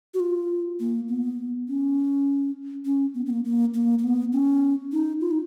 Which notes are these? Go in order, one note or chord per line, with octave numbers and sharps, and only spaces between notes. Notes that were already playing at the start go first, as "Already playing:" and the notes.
F#4
F4
A#3
B3
C#4
C#4
B3
B3
A#3
A#3
A#3
A#3
B3
C#4
D#4
F4
D#4